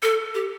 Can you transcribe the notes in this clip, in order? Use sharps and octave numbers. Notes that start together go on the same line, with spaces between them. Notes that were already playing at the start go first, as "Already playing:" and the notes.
A4
G4